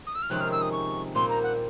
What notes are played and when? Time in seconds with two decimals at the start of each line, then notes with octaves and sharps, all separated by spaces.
0.07 D#6
0.15 E6
0.22 F6
0.30 F2 C3 D#3 G#3 C#4 F#6
0.40 F6
0.52 E6
0.62 D#6
0.72 C#6
1.15 A#2 G3 C4 C6
1.29 A#5
1.43 F#5